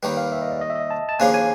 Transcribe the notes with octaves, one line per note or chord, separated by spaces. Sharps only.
D#2 D#3 G3 B4
F5
E5
D#5
D5
D#5
E5
D#5
A5
A5
D#2 C#3 F3 A#3 D4 G#5
G#5